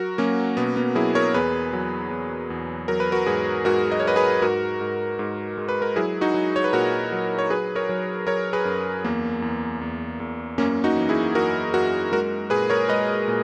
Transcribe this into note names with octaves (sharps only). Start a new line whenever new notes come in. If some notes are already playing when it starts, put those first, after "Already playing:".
Already playing: F#3 F#4 A#4
F#3 A#3 C#4
B2 B3
B3
F#3 E4 G#4
A#4 C#5
E2 G#4 B4
F#3
E2
E2
F#3 A#4
B4
F#4 A#4
G#2 G#4 B4
G#2 F#4 A#4
D#5
C#5
G#2 B4 D#5
G#4 B4
G#2 F#4 A#4
G#2
G#2
G#3
B4
A#4
F#3 E4 G#4
D#4 F#4
F#3
C#5
B4
A#2 F#4 A#4
F#3
C#5
F#3 G#4 B4
A#4 C#5
F#3
F#3 A#4 C#5
G#4 B4
F#2
E2 A#3
E2
E2
E2
F#2 A#3 C#4
D#4 F#4
E3
E4 G#4
F#2 F#4 A#4
F#2 F#4 A#4
G#3 F#4 A#4
A#2 G#4 B4
A#4 C#5
G#3 B4 D#5
A#2